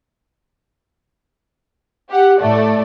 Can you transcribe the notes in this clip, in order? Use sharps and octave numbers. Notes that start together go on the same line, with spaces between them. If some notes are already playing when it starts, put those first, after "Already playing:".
G4 F#5
A2 A3 D5